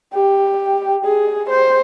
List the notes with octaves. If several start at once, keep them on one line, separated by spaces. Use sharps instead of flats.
G4
G#4
C5